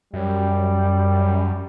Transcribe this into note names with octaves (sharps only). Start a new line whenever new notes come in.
F#2 G3